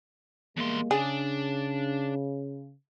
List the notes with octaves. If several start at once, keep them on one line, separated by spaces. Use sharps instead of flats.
E2 G3 G#3 A#3 C6
C#3 D4 G#4